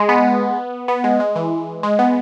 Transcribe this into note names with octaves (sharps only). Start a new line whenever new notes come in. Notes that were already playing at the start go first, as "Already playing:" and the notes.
Already playing: G#3
B3
B3
G#3
G#3
E3
G#3
B3